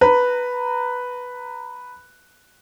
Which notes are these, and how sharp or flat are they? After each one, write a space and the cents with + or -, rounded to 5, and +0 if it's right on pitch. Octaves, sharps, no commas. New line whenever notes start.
B4 +0 A#5 -20